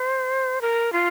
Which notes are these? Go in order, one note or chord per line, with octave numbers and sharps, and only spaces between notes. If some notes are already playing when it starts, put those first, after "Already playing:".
Already playing: C5
A#4
F4